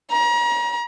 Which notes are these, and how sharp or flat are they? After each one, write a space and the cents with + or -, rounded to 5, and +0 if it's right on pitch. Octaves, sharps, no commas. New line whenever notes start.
A#5 +35